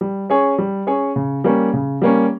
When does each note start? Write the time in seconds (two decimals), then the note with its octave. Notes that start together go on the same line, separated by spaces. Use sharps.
0.01 G3
0.30 C#4 G#4 C#5
0.58 G3
0.87 C#4 G#4 C#5
1.16 C#3
1.44 G3 A#3 C#4
1.73 C#3
2.02 G3 A#3 C#4